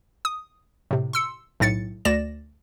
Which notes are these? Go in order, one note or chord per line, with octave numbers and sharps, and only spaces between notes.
D#6
A2 C3
C6 E6 C#7
B1 A2 A6 C#7
D2 D5 A#6 E7